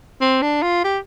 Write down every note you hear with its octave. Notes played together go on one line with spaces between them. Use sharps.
C4
D4
F4
G4